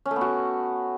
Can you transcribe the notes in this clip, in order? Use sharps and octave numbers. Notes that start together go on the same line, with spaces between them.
C#4
A3
B3
F#4
A3